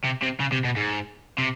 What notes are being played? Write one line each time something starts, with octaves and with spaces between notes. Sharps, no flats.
C3
C3
C#3
C3
B2
G#2
C3